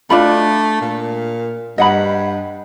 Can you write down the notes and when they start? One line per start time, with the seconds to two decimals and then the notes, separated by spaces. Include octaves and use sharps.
0.10 A3 D4 F4 B5
0.81 A#2
1.78 G2 D#5 F#5 B5